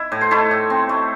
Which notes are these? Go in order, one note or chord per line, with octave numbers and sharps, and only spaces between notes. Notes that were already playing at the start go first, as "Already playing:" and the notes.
Already playing: E4
A2
C5
A3 E4 A4
A2
C4
A3